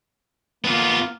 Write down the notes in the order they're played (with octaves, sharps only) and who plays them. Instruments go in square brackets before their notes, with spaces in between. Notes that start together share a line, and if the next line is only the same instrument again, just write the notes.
[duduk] A#3 [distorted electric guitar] B3 F4